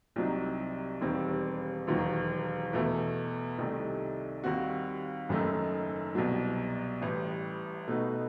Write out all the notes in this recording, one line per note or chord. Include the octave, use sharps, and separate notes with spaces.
C2 C3 F#3 C4 D#4
E1 D#2 D#3 G3 C4
E1 D#2 D#3 F#3
E2 B2 A3 E4
C2 C3 D#3 A3 D#4
D#2 D#3 G3 C4 F#4
F#1 F#2 D#3 A3 D#4
C2 B2 F#3
A1 A2 G3
B2 A3 D#4 F#4 B4